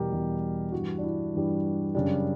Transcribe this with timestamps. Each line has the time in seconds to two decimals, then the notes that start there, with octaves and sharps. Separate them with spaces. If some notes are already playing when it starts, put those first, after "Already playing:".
Already playing: E2 B2 G3 G4 A#4
0.11 E2 B2 G3
0.72 G2 E3 G3 F#4
0.98 D4
1.03 E4
1.34 G2 E3 G3
1.95 F#2 C#3 G3 D4